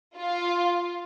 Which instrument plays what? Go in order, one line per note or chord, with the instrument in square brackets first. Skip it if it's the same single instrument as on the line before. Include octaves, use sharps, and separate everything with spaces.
[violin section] F4